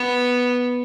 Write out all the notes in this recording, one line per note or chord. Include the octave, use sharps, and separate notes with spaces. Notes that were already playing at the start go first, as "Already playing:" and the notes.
Already playing: B3